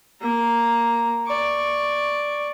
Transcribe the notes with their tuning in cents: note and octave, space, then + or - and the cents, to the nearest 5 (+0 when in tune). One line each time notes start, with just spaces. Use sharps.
A#3 +0 A#5 +0
D5 +0 C#6 +0